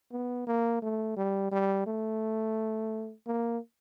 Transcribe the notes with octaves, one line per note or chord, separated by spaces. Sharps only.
B3
A#3
A3
G3
G3
A3
A#3